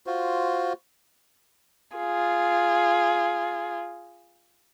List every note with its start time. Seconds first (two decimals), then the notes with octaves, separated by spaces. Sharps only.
0.07 F4 F#4 C5
1.97 F4 G#4